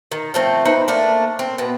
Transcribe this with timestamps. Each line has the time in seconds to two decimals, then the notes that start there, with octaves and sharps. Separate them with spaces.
0.12 D#3
0.34 F3 A3 C4
0.65 D#4 E4 B4 C5
0.88 A3 A#3 D4
1.39 C4
1.58 B2 B3